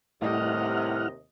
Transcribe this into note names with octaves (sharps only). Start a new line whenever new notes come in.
D#2 A2 C3 G3 E4 D#5 F#5 F6